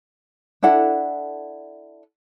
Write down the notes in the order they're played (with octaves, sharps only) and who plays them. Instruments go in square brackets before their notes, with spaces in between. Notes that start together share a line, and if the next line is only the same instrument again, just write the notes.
[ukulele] D4 E4 A4 F#5